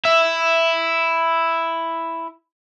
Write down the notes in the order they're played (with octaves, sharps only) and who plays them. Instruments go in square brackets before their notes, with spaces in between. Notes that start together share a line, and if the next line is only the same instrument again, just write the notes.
[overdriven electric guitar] E4 E5